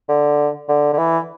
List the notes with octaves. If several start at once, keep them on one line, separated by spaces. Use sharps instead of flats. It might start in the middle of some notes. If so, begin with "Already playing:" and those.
D3
D3
D3
E3